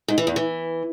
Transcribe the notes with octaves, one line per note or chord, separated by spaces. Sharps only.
G#2
E3
E2
E3